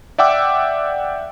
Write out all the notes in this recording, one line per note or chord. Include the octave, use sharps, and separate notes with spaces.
D5 E5 F#5 G5 D6 E6